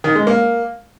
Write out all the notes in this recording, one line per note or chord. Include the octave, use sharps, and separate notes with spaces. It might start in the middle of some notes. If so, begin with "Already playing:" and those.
D#3
G#3
A#3